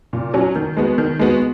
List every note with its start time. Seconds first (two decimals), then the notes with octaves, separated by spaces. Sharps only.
0.13 A#2
0.34 F#3 C#4 F#4
0.56 D#3
0.77 G#3 B3 F#4
0.98 D#3
1.19 G#3 B3 F#4